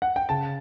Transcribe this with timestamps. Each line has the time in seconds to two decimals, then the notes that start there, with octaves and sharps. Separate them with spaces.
0.02 F#5
0.16 G5
0.29 C#3 A5